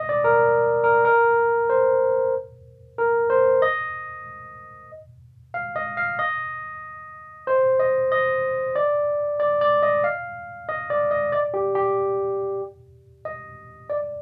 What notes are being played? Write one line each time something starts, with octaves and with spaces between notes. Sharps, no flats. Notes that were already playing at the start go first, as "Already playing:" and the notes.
Already playing: D#5
D5
A#4
A#4
A#4
C5
A#4
C5
D#5
F5
D#5
F5
D#5
C5
D#5
D#5
D5
D5
D5
D#5
F5
D#5
D5
D#5
D5
G4
G4
D#5
D5